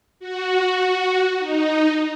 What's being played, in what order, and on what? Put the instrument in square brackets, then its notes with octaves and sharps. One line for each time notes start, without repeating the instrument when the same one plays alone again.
[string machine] F#4
D#4